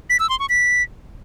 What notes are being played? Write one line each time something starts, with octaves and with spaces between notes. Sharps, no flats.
B6
E6
C6
C#6
B6